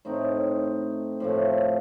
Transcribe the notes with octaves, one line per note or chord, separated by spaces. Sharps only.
A2 A3 C4 D#4
A2 F3 A3